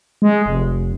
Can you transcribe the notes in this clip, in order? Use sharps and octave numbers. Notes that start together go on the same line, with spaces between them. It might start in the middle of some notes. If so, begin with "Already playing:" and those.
G#3
F1